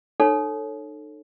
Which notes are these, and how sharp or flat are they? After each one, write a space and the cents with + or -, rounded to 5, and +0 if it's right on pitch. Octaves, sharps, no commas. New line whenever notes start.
D#4 -40 A4 +0 C#5 -15